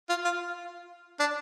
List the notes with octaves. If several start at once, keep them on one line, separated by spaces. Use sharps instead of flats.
F4
F4
D4